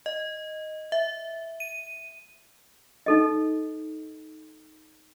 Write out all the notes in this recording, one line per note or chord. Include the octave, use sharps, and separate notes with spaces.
D#5
E5
D#7
D#4 A4 D#5